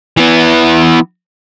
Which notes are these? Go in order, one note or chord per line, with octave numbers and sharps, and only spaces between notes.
E3 B3